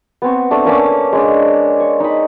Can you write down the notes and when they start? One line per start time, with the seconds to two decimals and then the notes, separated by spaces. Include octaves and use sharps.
0.22 B3 C4 C#6
0.51 A3 D4
0.65 A#3 C#4 A4 D6
1.12 G#3 C#4 D4
1.80 C#6
2.00 D#4 B5